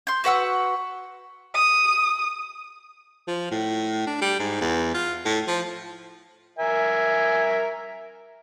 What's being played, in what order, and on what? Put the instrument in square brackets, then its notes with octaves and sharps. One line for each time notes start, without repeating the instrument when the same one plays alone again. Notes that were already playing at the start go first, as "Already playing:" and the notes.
[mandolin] C6 G6
F#4 B4 F#5 E6
[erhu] D#6
[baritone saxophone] F3
A2
D4
G3
G#2
E2
F4
A2
F3
[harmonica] A#4 E5 G#5